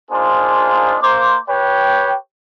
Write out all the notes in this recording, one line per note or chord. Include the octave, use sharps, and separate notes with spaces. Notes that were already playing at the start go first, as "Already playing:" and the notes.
A#3 D4 D#4 F4 G#4 C5
A#3 C5 D6
G4 B4 C#5 G5